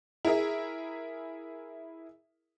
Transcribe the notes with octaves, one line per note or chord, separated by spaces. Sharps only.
E4 G#4 A#4 E5